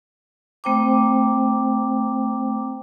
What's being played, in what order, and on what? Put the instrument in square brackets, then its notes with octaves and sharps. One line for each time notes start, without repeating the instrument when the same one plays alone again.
[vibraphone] A3 C4 C5 G5 A#5 D6